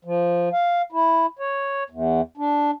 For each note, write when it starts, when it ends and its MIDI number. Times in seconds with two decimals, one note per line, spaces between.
0.05 0.49 53
0.53 0.82 77
0.92 1.26 64
1.39 1.83 73
1.90 2.21 40
2.37 2.71 62